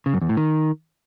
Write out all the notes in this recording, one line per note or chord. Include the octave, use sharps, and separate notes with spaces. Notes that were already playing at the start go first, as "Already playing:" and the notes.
C#3
F#2
E2
A2
D#3